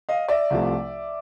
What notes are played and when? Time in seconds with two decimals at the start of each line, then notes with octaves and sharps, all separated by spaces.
0.09 D#5 F5
0.28 D5 E5
0.50 C2 C3 F3 A3